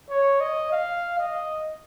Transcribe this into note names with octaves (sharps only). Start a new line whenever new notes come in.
C#5
D#5
F5
D#5